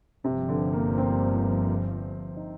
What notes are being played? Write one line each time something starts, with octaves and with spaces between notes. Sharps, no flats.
G1 G2 C3 F3
D3
A#3
C4
D#4